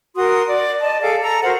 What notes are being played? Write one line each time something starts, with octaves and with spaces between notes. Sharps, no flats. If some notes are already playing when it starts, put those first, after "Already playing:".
F#4 A#4 C6 D#6
D5
D5 D#5 A5
G#4 A4 F5 D6
A4 A#5
F#4 A#4 C5 F#5